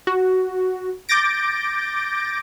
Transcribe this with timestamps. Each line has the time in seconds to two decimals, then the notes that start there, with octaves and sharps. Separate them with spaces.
0.07 F#4
1.09 D6 G6 A6 A#6 D7